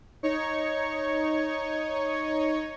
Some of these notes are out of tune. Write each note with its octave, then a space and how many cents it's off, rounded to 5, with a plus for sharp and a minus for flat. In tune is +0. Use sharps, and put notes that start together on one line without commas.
D#4 +0 C#5 +0 C#6 +0